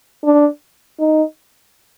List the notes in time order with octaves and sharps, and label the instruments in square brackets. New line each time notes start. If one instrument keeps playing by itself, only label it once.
[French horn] D4
D#4